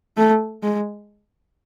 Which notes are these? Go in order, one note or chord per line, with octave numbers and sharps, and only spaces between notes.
A3
G#3